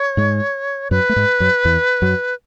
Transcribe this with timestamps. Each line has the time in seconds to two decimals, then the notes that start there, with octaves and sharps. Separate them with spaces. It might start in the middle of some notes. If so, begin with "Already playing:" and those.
Already playing: C#5
0.17 G#2 G#3
0.91 F#2 F#3 B4
1.09 A3
1.16 G#2 G#3
1.40 F#2 F#3
1.65 E2 E3
2.02 F#2 F#3